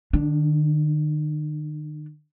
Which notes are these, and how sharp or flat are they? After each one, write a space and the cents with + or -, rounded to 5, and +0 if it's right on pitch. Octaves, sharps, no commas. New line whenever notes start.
D#3 -45 D4 +0